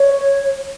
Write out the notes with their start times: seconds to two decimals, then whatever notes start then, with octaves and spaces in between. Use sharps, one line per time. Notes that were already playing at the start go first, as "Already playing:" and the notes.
Already playing: C#5